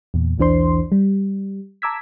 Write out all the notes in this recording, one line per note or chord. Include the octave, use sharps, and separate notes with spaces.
E2 A#2
B1 E2 E3 D4 C5 C6
G3
A5 A#5 D6 E6 G#6 B6